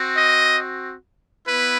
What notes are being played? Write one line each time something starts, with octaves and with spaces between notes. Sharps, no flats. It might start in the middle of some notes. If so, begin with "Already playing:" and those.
Already playing: C4 F#4
D#5
B3 E4 B4